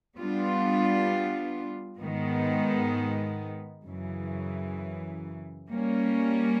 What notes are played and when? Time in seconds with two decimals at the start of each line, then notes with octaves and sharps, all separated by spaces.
0.17 G3 B3 D4 F4
2.01 G#2 D#3 G#3 B3
3.85 F#2 C#3 E3
5.69 G3 A#3 C#4